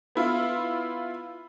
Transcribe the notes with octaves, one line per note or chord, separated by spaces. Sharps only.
B3 E4 F4